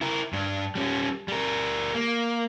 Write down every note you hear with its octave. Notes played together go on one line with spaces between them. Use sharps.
E4 A#4
G2 D4
G3 C#4
G3 A#4
A#3